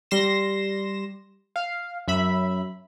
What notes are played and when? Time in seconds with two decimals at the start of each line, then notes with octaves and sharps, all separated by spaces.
0.11 G3 C6 A#6 E7
1.56 F5
2.08 F#2 E5 B5